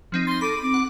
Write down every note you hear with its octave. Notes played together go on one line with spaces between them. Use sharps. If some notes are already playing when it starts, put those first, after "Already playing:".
F3 C4 D#4
C6 A6 A#6
A4 B5 D6 D#7
C4 D6
F#5